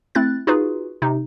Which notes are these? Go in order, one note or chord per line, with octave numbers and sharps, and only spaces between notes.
A3 C4 E4 F#6 A6
D#4 F4 F#4 G#4 B4
C3 D#4